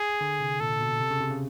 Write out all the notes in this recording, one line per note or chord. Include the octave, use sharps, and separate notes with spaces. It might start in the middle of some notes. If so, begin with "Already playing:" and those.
Already playing: G#4
D3
C3
A#2 A4
B2
C3
C#3
C3
C#3